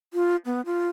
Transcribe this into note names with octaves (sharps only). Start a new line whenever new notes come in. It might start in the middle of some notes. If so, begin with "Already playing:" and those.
F4
B3
F4